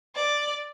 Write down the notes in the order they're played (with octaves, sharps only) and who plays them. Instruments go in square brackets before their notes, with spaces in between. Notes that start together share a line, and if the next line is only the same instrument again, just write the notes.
[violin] D5